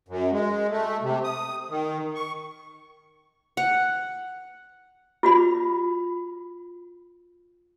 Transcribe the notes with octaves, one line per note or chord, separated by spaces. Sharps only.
F#2
G#3
A3
C3
D#6
D#3
C#6
F#5
F4 F#4 B5